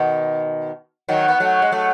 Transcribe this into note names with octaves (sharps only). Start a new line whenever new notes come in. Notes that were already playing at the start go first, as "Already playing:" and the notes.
Already playing: B2 D#3
D#3 F#3
B3
F#3 A3
G#3
F#3 A3